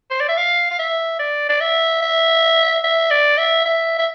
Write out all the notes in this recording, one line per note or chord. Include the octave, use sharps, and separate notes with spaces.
C5
D5
E5
F5
F5
E5
D5
D5
E5
E5
E5
D5
E5
E5
E5